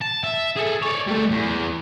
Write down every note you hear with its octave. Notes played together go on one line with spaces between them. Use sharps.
A5
E5
G#4 A4
C#5 D5
G3 A3
E2